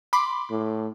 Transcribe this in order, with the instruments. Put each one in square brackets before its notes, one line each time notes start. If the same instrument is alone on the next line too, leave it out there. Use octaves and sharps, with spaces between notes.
[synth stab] B5 C6 D6
[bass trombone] A2